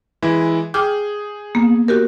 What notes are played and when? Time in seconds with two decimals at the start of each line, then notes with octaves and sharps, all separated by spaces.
0.22 E3 G#3 E4
0.74 G#4 G5 D6 F6 G6
1.55 A#3 B3
1.88 F#4 G4 A#4